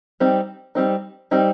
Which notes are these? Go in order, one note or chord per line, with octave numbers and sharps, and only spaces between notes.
G3 C4 D#4
G3 C4 D#4
G3 C4 D#4